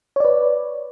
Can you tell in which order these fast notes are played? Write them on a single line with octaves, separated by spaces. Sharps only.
C#5 D5 B4